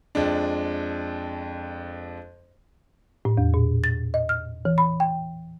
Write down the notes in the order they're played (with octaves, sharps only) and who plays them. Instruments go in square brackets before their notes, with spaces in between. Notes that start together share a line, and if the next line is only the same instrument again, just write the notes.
[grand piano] F2 G#3 D4
[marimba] A2
E2
A#2
A6
D#5
F6
E3
B5
G5